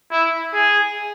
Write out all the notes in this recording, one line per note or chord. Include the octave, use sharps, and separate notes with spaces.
E4
G#4